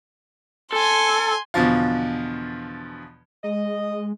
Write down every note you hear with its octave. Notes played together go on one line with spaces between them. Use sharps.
A4 G#5 C6
E2 B2 D3 F3 F4
G#3 D#5